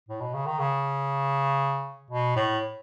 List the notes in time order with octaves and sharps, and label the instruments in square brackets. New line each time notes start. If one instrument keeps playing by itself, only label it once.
[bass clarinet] A2
B2
C#3
D#3
C#3
B2
A2